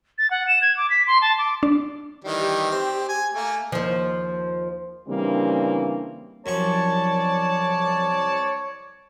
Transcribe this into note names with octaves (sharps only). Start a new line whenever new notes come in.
A6
F#5
E7
G#6
D6
B6
C6
A5
D6
D4
D#3 E3 G3
G4
C4
G#5
A3 A#3 G#5
D#2 F3
C#3 E3 G3 A#3 C4 D4
C2 F#2 F3 C#5 D5 A5 C#6